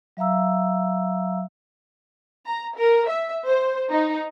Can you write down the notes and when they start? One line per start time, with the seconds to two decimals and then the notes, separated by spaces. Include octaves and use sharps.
0.17 F#3 E5 F5 A#5 E6
2.46 A#5
2.77 A#4
3.09 E5
3.46 C5
3.91 D#4